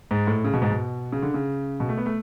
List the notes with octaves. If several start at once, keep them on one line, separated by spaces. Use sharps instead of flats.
G#2
A2
C#3
B2
G#2
B2
C#3
D3
C#3
B2
A3
B3
A3